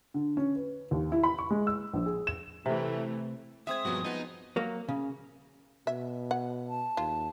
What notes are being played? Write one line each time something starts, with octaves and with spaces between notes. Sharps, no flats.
D3
C#4
B4
D#2
E4
B5
C#6
G#3
E6
A#1
G#4
E7
C3 E3 A3
G#3 C4 E5 D#6 G#6
G2 F3 F#3 B3 F#4
F3 B3 D#4 F#5
F#3 A#3
C#3
B2 E5
F#5
A5
D#2 F4